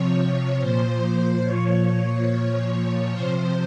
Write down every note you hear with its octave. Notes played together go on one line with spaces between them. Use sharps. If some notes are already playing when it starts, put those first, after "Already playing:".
Already playing: C3 F3 C#5
C#5
A#2 F3 C5
A#2 F3 C#5
A#2 F3
C3 F3 C5